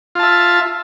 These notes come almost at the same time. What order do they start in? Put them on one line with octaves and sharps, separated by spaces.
F4 A5 E5